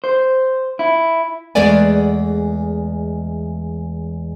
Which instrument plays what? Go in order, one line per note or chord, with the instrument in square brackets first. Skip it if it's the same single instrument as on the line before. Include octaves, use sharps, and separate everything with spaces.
[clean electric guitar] C5
E4
[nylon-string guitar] E2 G#3 A3 B3 D5 G#5